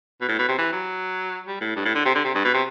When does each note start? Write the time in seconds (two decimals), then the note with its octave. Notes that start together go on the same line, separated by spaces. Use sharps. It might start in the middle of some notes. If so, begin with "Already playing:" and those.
0.21 B2
0.29 A2
0.39 B2
0.48 C3
0.58 E3
0.72 F#3
1.47 G3
1.61 A2
1.76 G2
1.85 A2
1.95 D3
2.05 C3
2.15 D3
2.24 C3
2.35 G2
2.44 B2
2.54 C3